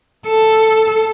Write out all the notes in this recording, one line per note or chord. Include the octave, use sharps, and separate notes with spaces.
A4